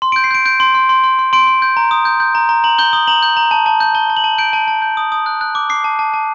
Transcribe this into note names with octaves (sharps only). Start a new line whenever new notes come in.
C6
G6 D7
C7
G6 D7
G6 D7
C6
C6
C6
C6
C6
C6 D7
C6
G6
A#5
D#6
G6
G6
A#5
A#5
A#5 F#7
G6 G7
D#6 G7
A#5 F#7
G6
A#5
A5
A5
G6
A5 G7
A5
F#7
A5
G6 D7
A5
A5
G6
D#6
D#6
F#6
F#6
D6
D6 C7
A5
A5
A5